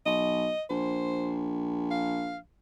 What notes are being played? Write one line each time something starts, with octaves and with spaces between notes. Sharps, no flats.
B1 D#5
A#1 C5
F5